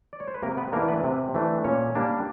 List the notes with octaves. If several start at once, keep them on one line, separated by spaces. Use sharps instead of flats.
D5
C#5
C5
B4
C3 A#3 A#4
B3 B4
E3 A3 A#3 D4 A#4
B3 B4
C3
E3 A3 D4
A#2 C#4 C#5
G3 A#3 D4